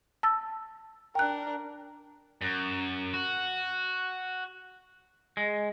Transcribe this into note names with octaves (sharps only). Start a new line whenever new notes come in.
A5 E6 A6
D4 A#4 G5 F#6
F#2
F#4
G#3